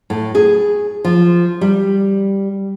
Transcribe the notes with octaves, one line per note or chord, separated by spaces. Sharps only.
A2
G#4
F3
G3